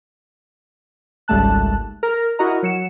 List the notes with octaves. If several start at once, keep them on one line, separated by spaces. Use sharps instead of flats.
G#1 C#2 G3 A3 A5 F#6
A#4
E4 F#4 A#4 D#5 A#5
F#3 C#7 E7